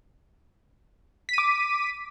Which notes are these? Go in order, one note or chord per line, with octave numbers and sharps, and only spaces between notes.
D6 B6 D#7